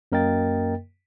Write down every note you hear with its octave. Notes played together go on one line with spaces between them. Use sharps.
F#2 A#3 A#4 D#5 G5 A6